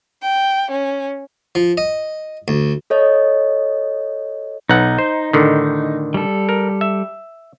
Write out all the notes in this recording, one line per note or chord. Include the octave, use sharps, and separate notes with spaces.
G5
C#4
F3
D#5
D2
A4 C#5 D#5
B1 D#4 F#5
C5
A2 D3 D#3
G3 A4
A#4
E5